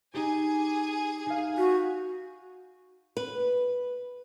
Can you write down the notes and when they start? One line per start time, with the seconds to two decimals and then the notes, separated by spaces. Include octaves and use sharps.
0.14 D#4 G4 G#4 G#5
1.26 D#4 F5
1.57 F#4 F6 G6 B6
3.17 B4